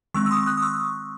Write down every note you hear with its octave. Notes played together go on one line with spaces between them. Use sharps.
D#3 G#3 C4 C#6 E6
E6
C6 D#6
D#6 F#6
D#6
C#6 E6